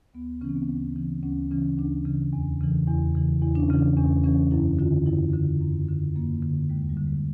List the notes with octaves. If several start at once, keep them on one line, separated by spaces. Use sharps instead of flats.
D2 B3
C#3 E3 C4 C#4
B3
C4
D2
C#3 E3
D2 C#4
C#3 E3 C#4
D2 D4
C#3 E3
E2
C#3 E3
E2 E4
C#3 E3
E2 E4
D4
C#4
C#3 E3
D4
E2 C#4
C#3 E3 C#4
F#2 E4
D3 F4
F#2 E4
D3
F#2
D3
F#2 A#3
D3
D#2 G#3
G3
D3
G#3